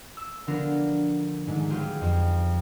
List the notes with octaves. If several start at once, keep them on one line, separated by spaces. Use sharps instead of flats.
E6
D3 F3 B3 D4 A#4
G#2 D#3 G#3 A3
F#3 B3 F4 G4 G#4
F2